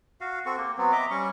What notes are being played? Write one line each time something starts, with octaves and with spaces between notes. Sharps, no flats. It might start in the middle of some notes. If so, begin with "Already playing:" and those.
F#4 F5
C4 F#4 A4 C#6
A#3 G4
F#3 B3 C4
D#5 E5 A#5 D6
G3 C#4 C#6